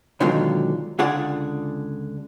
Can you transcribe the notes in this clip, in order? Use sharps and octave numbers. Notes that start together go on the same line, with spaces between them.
B2 D3 D#3 F#3 G#3 F4
C#2 D3 F4 G#4 D5 F#5